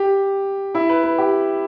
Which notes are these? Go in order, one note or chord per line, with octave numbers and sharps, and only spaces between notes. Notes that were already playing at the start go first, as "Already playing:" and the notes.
Already playing: G4
E4
B4
B4
G4